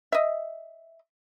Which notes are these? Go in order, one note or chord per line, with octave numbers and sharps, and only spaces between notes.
D#5 E5